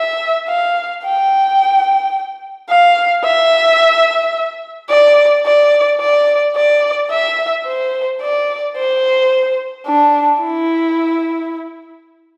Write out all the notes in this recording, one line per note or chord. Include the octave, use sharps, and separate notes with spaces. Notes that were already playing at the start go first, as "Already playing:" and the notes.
Already playing: E5
F5
G5
F5
E5
D5
D5
D5
D5
E5
C5
D5
C5
D4
E4